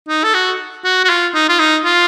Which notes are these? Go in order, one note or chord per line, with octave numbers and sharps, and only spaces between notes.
D#4
A4
F#4
F#4
F#4
F4
D#4
F4
D#4
F4